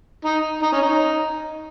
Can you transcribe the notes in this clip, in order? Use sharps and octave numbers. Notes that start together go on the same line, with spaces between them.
D#4
D#4
C#4
D#4